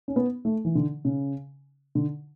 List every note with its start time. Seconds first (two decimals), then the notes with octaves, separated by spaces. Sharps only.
0.08 C#4
0.16 B3
0.45 A3
0.65 E3
0.75 D3
1.05 C#3
1.95 D3